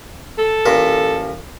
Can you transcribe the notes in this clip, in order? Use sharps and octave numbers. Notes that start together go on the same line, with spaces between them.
A4
A1 A#2 A#4